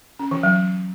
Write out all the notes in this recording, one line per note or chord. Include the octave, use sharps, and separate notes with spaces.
C#4
E3
F#3